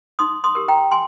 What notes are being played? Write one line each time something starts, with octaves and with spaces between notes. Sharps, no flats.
D#4 C6 D#6
C6 D#6
G4 A#4
G5 A#5
G#5 C6